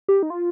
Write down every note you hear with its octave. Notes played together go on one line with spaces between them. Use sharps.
G4
D#4
F4